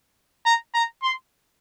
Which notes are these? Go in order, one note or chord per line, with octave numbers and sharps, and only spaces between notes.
A#5
A#5
C6